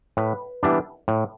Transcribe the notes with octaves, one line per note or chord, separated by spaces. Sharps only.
A2 B4
E3 G3 B3 D4
A2